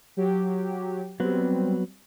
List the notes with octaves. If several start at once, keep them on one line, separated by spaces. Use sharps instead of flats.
F#3 G4
F#3 G3 B3 C4 B4